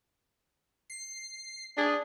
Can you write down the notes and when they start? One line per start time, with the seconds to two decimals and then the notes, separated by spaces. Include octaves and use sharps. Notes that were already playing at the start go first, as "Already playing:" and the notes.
0.90 C7
1.78 D4 G#4